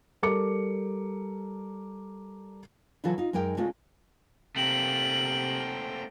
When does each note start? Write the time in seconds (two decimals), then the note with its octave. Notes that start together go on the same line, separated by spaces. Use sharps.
0.23 G3 A4 A#4 D6 C#7
3.04 C#3 E3 F#3 F4 F#4 A4
3.18 D#4 F4
3.33 F#2 G#3 D#4 A#4 G5
3.57 C3 G#3 A3 C#4 F4 A4
4.56 C3 A3 A#3 C4 G5 F#7